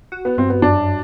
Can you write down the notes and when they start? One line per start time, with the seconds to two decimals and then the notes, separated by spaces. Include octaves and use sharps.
0.12 F#4
0.25 B3
0.38 G2 C4
0.50 B3
0.62 F#2 D4